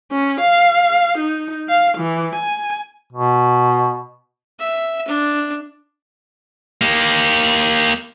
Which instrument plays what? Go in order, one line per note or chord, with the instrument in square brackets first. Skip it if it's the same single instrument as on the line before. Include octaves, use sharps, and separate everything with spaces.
[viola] C#4
F5
D#4
F5
E3
G#5
[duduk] B2
[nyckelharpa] E5
D4
[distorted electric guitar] A#3 G4